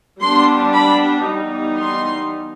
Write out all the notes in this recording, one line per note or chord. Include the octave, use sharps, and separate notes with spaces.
G3 B3 D4 C6
B5
E3 G3 B3 D#4
C6